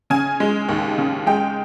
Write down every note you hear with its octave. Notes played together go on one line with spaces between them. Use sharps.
C#3 G#5
G#3
D#2
C#3
G#3 G5